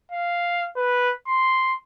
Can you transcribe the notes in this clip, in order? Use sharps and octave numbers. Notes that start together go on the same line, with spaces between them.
F5
B4
C6